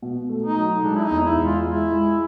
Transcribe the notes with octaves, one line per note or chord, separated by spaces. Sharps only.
B2
A3
D#4
F#3
G#3 D4
E4
D#4
E2
E4
G#3
F4
G#3 E4
G#3